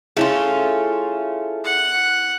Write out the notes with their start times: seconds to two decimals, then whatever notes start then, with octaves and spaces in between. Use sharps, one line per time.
0.17 A3 C#4 E4 F4 G#4
1.64 F#5